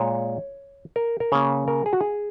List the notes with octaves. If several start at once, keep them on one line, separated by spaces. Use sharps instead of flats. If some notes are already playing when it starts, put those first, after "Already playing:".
Already playing: A#2 G#3 C#5
A#4
A#4
C#3 A#3 C#5
A#4
G#4
F#4
G#4